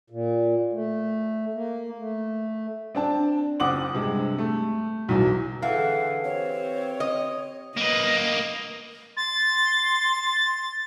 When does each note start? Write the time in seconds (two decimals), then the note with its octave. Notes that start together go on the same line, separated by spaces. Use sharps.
0.10 A#2
0.73 A3
1.54 A#3
1.98 A3
2.95 C4 D4 A5
3.60 F#1 C4 F#5 D6 D#6 F#7
3.93 G2 C3 G#3
4.38 A3
5.09 B1 E2 F#3
5.62 D3 E3 G#4 A4 F5 F#5
6.24 C4 G4 C#5
7.00 D#5
7.77 A#3 B4 D#5
9.17 C6 A6